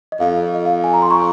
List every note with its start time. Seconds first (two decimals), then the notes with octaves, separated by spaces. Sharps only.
0.12 D#5
0.20 F2 F5
0.54 D#5
0.65 F5
0.84 G#5
0.93 A#5
1.02 C6
1.10 A#5 C#6